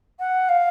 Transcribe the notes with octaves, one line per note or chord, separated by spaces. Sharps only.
F#5
F5